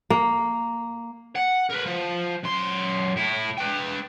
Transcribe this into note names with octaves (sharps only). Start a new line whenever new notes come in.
A#3
F#5
A#4 B4
F3
F#2 C6
A2 E4
B4 G5